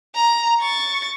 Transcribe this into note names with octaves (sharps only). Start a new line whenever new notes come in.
A#5
C#6 A6